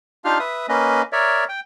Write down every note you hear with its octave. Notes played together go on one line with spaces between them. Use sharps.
D4 D#4 F4 G4 F5 F6
B4 E5 D#6
A#3 C#4 B4 D#5
A#4 C#5 D5 E5
G5